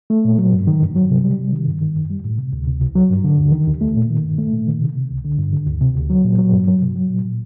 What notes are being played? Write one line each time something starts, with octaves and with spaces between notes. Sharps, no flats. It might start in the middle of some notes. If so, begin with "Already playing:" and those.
A3
A#2
F#3
G2
D#3
G2
F#3
C3
G3
C3
D#3
G2
D#3
F#2
G3
A2
C3
D2
C3
C2
F#3
G2
D3
D#2
D#3
D#2
A3
A#2
D#3
G2
A3
A#2
D#3
C3
C3
C2
D3
G2
D3
D2
C3
D2
F#3
A#2
F#3
G2
F#3
C3
F#3
A#2
A#2